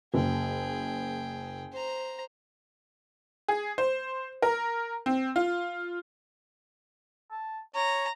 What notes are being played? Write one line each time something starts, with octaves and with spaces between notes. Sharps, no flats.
F#1 G#4 G5
C5 A#5
G#4
C5
A#4
C4
F4
A5
C#5 A#5